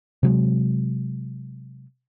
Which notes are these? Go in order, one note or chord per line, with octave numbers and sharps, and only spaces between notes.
C3 F#3 G#3